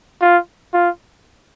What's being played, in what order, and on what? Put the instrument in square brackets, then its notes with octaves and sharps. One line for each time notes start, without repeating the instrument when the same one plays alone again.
[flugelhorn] F4
F4